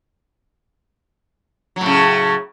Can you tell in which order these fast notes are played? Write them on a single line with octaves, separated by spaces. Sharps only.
F#3 A2 C#3